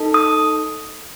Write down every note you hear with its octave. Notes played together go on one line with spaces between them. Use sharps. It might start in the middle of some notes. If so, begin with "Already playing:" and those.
Already playing: D#4 A4
D#6